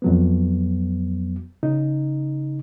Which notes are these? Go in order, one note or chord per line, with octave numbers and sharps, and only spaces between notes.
F2 F#3 B3
C#3 D#4